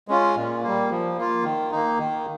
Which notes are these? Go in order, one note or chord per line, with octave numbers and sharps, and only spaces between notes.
G#3 C#4 F4
A#2
G3 A#3
F3
A#3 F4
D#3
A#3 D#4
D#3